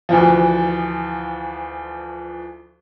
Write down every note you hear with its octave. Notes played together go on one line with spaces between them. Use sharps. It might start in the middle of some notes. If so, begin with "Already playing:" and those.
D2 E3 F3